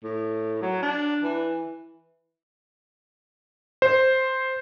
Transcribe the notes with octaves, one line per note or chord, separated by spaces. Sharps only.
A2
F#3
D4
E3
C5